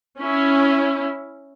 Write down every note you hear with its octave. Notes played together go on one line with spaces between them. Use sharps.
C#4 E4